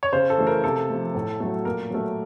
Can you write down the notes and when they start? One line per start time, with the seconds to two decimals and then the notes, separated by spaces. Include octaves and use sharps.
0.03 C#5
0.13 C#3 C5
0.30 A4
0.38 E3 A3
0.47 A#4
0.64 C3 A4
0.89 F3 A3
1.15 A2
1.40 F#3 A3
1.65 A#2 A#4
1.90 F#3 A3